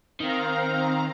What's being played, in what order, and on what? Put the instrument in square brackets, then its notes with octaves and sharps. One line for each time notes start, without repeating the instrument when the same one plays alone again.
[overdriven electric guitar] D#3 [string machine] C4 F5 A#5